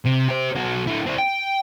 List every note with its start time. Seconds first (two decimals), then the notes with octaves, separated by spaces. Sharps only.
0.06 C3
0.29 G4 C5
0.56 B1 F#4
0.87 D3 E4
1.06 C4 E4
1.19 G5